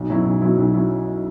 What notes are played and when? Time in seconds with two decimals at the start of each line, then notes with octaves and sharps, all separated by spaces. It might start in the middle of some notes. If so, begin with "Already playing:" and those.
Already playing: B1
0.10 B2 F#3 C#4 E4
0.25 B1
0.42 B2 F#3 C#4 E4
0.58 B1
0.74 F#3 C#4 E4